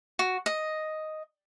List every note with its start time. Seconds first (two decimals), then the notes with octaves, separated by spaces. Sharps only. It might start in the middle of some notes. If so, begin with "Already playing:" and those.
0.19 F#4
0.46 D#5